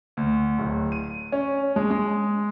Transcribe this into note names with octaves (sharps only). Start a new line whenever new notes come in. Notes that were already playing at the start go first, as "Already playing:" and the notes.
D2
D1
D#7
C#4
G#3
G#3